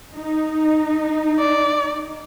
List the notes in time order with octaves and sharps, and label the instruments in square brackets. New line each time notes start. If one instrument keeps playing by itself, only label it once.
[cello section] D#4
[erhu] D5